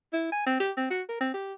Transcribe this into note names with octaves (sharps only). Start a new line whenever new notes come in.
E4
G#5
C4
G4
C4
F#4
A#4
C4
G4